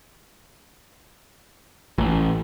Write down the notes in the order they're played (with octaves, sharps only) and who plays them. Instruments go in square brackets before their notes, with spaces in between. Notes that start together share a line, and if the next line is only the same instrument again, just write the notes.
[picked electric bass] A1